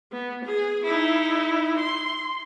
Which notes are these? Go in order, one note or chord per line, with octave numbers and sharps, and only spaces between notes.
B3
G#4
D#4 E4
C6